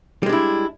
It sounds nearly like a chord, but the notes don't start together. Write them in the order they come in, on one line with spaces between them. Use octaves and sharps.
G3 G#3 D4 E4